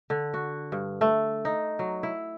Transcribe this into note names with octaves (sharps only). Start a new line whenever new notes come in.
D3
F#4
G2
A3
D#4
F#3
E4